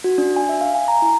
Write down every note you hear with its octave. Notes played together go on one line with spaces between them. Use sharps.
F#4
D4
G#5
E5
F5
G#5
A#5
E4